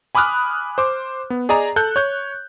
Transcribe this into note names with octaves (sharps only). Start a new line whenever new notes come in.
G#5 B5 D6 D#6 F6 F#6
C5 D6
B3
G#4 D5 D#5 G#5 A#5
A4 F#6 G6
C#5 G6